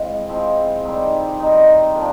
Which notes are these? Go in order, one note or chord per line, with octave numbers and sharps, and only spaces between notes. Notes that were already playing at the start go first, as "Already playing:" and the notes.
Already playing: F3 G#3 C4 E4
F3 G#3 C4 E4
D#3 G3 C4 D#4
D#3 G3 C4 D#4
D3 F3 A#3 D4